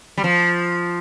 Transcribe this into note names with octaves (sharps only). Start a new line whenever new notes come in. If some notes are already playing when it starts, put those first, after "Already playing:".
G3
F3